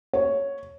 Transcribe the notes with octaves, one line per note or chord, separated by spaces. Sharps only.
C#5